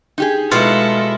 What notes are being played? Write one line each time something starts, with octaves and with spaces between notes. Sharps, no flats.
D#4 G4 G#4
B2 G#3 E4 F4 A4